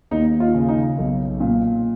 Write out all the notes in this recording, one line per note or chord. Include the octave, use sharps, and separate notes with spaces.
D#2 D#4
F4
C#3
D#4
B1
A#2